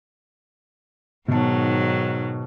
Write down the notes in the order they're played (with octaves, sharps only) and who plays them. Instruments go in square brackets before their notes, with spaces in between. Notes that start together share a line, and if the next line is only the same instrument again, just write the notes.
[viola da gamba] G#2 D#3 F#3 [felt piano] B2 A5